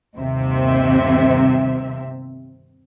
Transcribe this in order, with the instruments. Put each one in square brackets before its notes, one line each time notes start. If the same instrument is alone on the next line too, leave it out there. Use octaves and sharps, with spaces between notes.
[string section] G1 D#2 C3 C4 E5